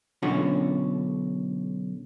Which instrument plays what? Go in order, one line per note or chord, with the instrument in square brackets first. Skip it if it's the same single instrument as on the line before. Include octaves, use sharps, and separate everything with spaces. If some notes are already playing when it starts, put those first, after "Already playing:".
[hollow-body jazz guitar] B1 D3 C#4 F4 F#4